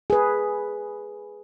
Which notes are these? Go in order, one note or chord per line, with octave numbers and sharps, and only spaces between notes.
G#4 B4